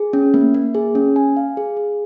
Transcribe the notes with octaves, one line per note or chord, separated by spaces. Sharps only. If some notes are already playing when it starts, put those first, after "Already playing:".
Already playing: G#4
C#4
A#3
A#3
G#4
C#4
G#5
F5
G#4
G#4